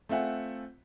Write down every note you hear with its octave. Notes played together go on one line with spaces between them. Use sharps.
A3 C4 F4 E5 F#5 G#5